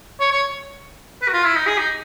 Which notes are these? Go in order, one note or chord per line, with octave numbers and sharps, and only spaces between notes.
C#5
C#5
B4
F#4
F4
E4
D#4
G#4
D#4